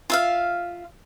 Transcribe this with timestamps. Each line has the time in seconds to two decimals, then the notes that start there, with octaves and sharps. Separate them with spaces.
0.10 F4 E5 F5